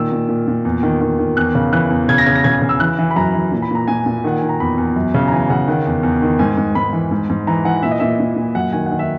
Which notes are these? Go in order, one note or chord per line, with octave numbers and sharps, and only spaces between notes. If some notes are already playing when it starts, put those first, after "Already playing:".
Already playing: A#2 D#3 E6
A#2
A#2
A#2
E2
D#3
D#3
D#3
E2 F#6
C#3
E3 F#6
E2
C#3 G#6
A#6
C#3 G#6
A#6
C#3 G#6
C#3
E6
E3 F#6
E3
B5
F#2 A#5
E3
A#2
B5
A#2 A#5
A#2 G#5
A#2
D#3 F#5
D#3 G#5
A#5
E2 B5
E2
F#2
C#3
A#5
E3 G#5
C#3 F#5
D#3 F#5
E2
E2
D#3
G#2 G#5
G#2
G#2 B5
E3
G#2
G#2
E3 A#5
E3 F#5
A#2 E5
D#5
A#2 E5
A#2
A#2
F#2 F#5
D#3 G#5
D#3 F#5
E5